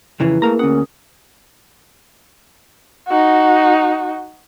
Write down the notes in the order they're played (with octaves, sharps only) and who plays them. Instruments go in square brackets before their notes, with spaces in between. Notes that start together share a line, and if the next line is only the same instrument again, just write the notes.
[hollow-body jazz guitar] F2 C#3 E3 [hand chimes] E4 B4
[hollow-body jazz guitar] A3 F5 A#5 [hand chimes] A#3 G#4 A#4
[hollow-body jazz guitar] D2 F#5 [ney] C#4 [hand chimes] D#6
[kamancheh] D#4 F#4